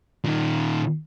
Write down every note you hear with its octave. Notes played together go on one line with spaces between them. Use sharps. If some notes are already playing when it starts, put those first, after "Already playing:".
A#2 D#3